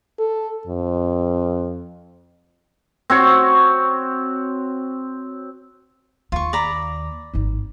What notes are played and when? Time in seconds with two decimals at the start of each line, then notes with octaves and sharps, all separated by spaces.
0.19 A4
0.67 F2
3.10 C4 F#4 C#5
6.32 D#2 F4 C#6
6.53 D5 A#5 B5
7.34 G#1 D#4